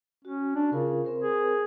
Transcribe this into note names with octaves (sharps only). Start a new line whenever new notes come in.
C#4 F#4
D4
C#3 F4 A#4
C4 A#4 C5
G#4